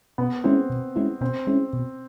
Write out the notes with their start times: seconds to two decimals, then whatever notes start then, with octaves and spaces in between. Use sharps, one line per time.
0.18 B2 B3
0.44 G#3 C4 C#4 E4
0.70 B2
0.96 G#3 C#4 E4
1.21 B2 C4
1.47 G#3 C#4 E4
1.73 B2